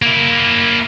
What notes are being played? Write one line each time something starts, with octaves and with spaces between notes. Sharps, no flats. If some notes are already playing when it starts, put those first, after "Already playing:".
A#3 E4